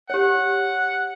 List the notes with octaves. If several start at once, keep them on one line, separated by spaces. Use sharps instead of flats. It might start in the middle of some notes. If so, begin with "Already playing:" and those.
G4 C#5 F#5